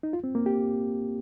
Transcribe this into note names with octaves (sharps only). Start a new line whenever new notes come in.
D#4
F4
C4
A#3
G4